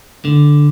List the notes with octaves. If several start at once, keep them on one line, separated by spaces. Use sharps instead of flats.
D3